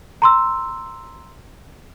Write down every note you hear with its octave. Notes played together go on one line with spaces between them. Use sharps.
A#5 C6 E6